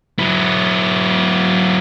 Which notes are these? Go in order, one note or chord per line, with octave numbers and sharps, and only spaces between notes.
F#3 E4